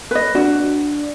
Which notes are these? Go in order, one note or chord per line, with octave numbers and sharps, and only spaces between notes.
B4 D#5
D4 F#4